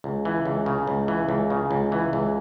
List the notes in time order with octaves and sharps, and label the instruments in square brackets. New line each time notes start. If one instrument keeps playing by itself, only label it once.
[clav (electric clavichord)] C#2
E3
C#2
C#3
C#2
E3
C#2
C#3
C#2
E3
C#2